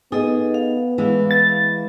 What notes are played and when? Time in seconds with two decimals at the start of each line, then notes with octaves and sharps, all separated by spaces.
0.12 B3 D#4 G#4 A4 D#5
0.54 F5
0.98 E3 G#3
1.31 A6